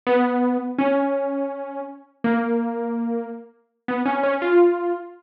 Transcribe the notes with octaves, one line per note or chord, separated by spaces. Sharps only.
B3
C#4
A#3
B3
C#4
C#4
F4